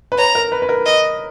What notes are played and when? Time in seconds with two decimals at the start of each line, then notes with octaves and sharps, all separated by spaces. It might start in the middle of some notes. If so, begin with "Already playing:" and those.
0.12 B4
0.18 C#5 A#5
0.35 A#4
0.52 B4
0.62 B4
0.69 A#4
0.86 D#5